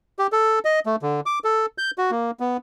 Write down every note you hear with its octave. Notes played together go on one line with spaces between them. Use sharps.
G4
A4
D#5
A3
D3
D6
A4
G6
F#4
A#3
B3